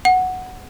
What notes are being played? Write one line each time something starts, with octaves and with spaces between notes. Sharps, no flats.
F#5